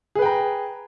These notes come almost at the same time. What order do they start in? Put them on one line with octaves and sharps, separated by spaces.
G#4 B4 G5 A#5